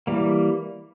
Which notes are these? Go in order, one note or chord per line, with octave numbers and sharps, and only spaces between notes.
E3 G3 A#3